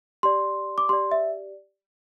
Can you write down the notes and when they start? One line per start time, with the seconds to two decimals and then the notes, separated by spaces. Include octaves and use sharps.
0.23 G4 D5 C6
0.78 D6
0.89 G4 D5 C6
1.11 E5